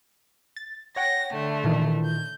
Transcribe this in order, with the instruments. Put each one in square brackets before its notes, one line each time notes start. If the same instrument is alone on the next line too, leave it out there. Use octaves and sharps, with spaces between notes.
[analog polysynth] A6
[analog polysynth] C#5 F#5 G5 [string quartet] A#6
[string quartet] D3 A3
[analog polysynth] A#2 D#3 E3
[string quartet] G6